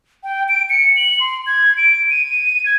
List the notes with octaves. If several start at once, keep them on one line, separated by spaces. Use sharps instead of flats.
G5
D7
C#7
F#7
C6
G#6
D7
D#7
G#6